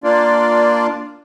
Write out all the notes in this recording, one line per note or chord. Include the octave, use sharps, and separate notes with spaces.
A#3 D4 F4 D5